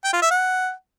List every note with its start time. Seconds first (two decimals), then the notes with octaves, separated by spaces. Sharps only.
0.04 G5
0.13 F4
0.22 E5
0.31 F#5